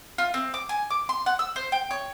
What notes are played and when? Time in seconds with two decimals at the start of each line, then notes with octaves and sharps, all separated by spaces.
0.18 F4
0.34 C4
0.54 D6
0.69 G#5
0.91 D6
1.09 C6
1.26 F#5
1.39 E6
1.56 C5
1.72 G5
1.91 C#5